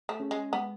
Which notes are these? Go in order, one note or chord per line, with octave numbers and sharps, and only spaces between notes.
A3
C#4 G#4 C#5
G#3
G#3 B3